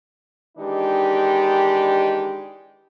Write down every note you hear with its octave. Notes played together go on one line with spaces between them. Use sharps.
D#3 E3 G#3 D4 D#4 G4